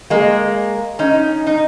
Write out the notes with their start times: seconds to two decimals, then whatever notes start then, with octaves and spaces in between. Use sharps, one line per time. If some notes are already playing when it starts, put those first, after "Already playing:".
0.10 G#3 A#3
0.99 C#4 D#4
1.47 D#4